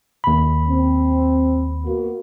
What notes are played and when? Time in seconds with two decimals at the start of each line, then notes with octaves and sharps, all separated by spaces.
0.24 D#2 B5
0.68 C4
1.84 A#3 B3 F#4